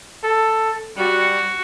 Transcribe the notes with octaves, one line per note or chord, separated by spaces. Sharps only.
A4
G3 F#4